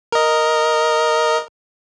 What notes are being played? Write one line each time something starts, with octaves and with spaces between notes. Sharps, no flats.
A#4 D#5